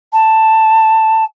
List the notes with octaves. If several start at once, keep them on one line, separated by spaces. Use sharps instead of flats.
A5